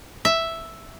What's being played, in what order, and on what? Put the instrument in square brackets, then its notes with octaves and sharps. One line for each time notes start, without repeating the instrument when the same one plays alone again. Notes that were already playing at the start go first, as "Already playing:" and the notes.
[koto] E5